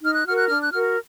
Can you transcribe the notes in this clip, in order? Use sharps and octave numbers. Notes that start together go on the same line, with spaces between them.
D#4 F6
F#6
F#4 A#4 F6
F#6
D4 F6
F#6
F#4 A#4 F6